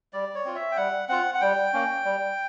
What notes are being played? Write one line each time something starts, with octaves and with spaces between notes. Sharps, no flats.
G3 D5
C#5
C4 F4
E5
G5
G3 F#5
C4 F4 F#5
F#5
G3 G5
A#3 C#4
G3